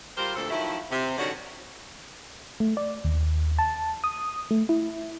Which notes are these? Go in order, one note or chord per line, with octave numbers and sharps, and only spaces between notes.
G3 F4 G4 A#4 C5
D2 G2 A#2 C4 A4
D#3 F3 F#3 A3 E4
C3
D3 D#3 F#3 C#4 D4 F#4
A3
D5
D#2
A5
D#6
A3
E4